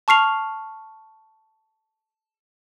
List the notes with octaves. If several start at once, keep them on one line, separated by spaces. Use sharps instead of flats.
A5 C#6 F6 C7 F7